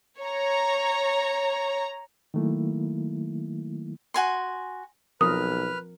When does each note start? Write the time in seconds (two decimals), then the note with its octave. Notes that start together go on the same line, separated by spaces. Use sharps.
0.21 C#5 A#5
2.34 D#3 F#3 A3 A#3 E4
4.14 F#4 G#5 C6
5.21 B1 F3 C4 A#4 B4 D#6 F6